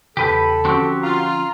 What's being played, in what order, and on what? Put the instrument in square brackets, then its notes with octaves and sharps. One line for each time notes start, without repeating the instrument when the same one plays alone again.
[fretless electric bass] E2 C#3 [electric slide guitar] G4 B4 [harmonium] A4
[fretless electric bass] D3 F3 C#4 [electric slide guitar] C4 F#4 G4
[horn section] F4 [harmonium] A#5